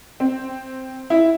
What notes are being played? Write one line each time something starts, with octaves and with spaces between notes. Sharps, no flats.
C4
E4